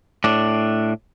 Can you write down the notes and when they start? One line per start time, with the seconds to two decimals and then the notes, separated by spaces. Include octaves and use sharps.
0.24 A2 D4